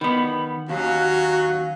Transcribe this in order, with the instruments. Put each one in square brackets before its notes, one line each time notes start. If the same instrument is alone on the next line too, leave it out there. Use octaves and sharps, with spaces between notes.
[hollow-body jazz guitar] D#3 B3 [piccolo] B5
[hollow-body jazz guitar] D#2 [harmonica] F#3 C#4 [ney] F#4 [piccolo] F5